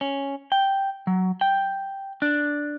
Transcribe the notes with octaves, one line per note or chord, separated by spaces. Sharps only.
C#4
G5
F#3
G5
D4